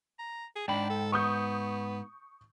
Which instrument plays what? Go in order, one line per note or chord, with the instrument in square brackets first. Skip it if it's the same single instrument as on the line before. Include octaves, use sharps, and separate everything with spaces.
[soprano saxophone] A#5
G#4
[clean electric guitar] G#2 B5 [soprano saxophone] D4 [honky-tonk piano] G5
[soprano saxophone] A4
[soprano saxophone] B3 [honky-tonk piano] C#6 D#6 G6